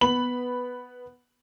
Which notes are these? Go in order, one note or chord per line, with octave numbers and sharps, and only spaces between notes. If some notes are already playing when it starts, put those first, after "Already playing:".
B3 B5 F#7